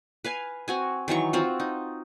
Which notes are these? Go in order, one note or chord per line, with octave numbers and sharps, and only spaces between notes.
B4 F5 G#5
C4 F#4 G#5
D#3 E3 F#3 C#6
C4 F4 F#4
D#4